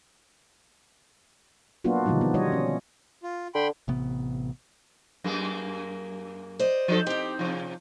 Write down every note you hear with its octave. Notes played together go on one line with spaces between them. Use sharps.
F#3 A#3 B3 D4 F4 F#4
B2 D3 D#3 F3 G3 D#4
B3
G3 F4 C#5 D#5
C#4
F4
D3 G5 B5 C6
A1 C3 B3
F#2 A#3 G#4
C5 D5 D#5
F3 D#4 A4
C4 D#4 G4
C3 F3